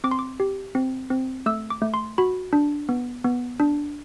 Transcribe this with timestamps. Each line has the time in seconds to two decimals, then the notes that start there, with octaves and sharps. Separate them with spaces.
0.04 C4 D6
0.11 C6
0.19 D6
0.40 G4
0.75 C4
1.10 C4
1.46 A3 E6
1.70 D6
1.82 A3
1.94 C6
2.18 F#4 B5
2.53 D4
2.89 B3
3.24 B3
3.60 D4